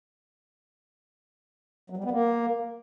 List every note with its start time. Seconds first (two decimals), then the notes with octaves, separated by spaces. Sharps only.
1.90 F#3
1.97 G3
2.04 B3
2.11 A#3